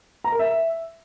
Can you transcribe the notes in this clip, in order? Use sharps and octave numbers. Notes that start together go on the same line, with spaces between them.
A#5
A#4
E5